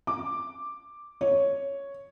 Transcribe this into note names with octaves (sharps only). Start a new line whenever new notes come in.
D6
C#5